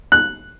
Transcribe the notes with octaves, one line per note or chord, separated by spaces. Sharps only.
F#6